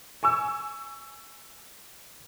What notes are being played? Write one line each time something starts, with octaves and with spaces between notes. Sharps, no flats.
G#5 C#6 E6